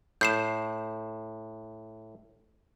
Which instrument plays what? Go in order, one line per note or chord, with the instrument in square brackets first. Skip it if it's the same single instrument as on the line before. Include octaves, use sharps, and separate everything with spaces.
[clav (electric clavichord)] A2 [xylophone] G6 C7 E7